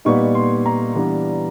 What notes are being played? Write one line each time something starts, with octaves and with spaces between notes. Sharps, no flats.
A#2 G3 B3 D#4 C#6
C6
A#5
E3 G3 B3 D4